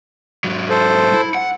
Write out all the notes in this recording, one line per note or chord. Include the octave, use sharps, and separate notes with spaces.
G#2 F#3
A4 C5
E4
F#5